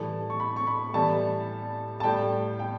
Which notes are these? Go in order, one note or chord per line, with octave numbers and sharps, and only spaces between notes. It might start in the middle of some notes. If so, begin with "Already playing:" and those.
Already playing: A2 E3 G3 A5
C#6
B5
C#6
B5
A2 E3 G3 A5
A5
A2 G3 G5
G5